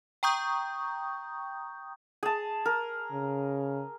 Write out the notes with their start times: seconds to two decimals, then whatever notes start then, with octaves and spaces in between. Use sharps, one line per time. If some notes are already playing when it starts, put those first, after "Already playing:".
0.23 G5 A#5 C#6 D#6 G6
2.23 G#4 A5
2.66 A#4
3.12 C#3